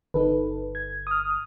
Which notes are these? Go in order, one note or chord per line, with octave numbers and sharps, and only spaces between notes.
G1 D#4 A4 B4
G#6
D#6 F6